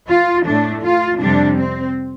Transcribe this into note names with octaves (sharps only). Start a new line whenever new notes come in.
F4
A2 A3 D4
F4
F2 C3 G3 D4
C4